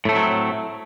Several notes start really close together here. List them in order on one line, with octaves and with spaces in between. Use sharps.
A2 A3 C4 F#3